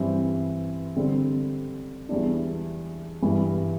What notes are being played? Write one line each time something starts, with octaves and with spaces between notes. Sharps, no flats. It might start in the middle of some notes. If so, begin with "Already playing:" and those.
Already playing: G2 E3 G3 C4
D3 G3 C4
E2 E3 G3 D4
G2 E3 G3